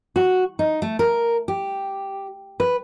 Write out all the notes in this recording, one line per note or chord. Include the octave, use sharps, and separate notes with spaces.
F#4
D#4
A3
A#4
G4
B4